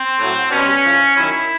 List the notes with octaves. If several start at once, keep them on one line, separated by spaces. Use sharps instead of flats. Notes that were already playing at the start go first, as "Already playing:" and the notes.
Already playing: C4
A2 F#3
B2 G3 C#4
A2 F3
F#2 D#3 F#3 E4